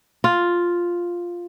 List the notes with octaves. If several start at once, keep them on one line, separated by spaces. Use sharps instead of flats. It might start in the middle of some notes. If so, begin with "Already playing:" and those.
F4